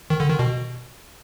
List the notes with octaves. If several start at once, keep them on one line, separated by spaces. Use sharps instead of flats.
D#3
D3
D#3
B2